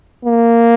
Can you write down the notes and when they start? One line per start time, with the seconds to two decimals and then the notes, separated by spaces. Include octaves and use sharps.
0.25 A#3